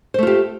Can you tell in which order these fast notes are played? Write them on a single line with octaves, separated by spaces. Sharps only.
C5 A3 F4 G4